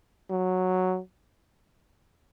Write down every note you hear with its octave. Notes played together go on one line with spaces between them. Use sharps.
F#3